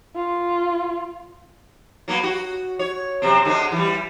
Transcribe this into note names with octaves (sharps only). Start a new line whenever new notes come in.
F4
F#3 A#3 B3
F#4
C#5
F#2 C3 C4
D3 G#3 C4
E3 G3